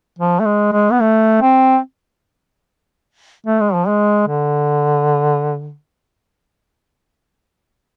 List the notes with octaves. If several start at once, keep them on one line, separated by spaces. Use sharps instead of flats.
F3
A3
G#3
G#3
B3
A3
C4
A3
G#3
F3
G#3
D3